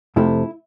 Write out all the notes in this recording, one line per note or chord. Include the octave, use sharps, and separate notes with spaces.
F2 C3 F3 A3 E4